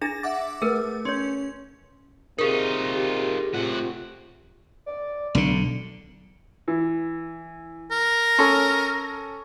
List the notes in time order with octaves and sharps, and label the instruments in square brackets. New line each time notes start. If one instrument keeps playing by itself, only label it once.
[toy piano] D4 G#4 A#5 [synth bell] A6 A#6
[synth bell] E5 F#5 D6
[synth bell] A3 [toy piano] G#4 A#4 B4
[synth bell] C#4 [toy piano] C#5 C6
[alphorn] C3 [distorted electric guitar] D#4 F4 [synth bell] G#4 A#4
[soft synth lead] G4
[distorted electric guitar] A2 F#5 [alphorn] C3 [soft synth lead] F4
[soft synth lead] D5
[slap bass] B1 D3 [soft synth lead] D4
[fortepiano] E3
[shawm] A#4
[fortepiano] C#4 A4